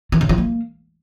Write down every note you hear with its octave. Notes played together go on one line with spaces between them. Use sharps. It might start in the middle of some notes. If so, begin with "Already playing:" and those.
E3
C#3
F3
A#3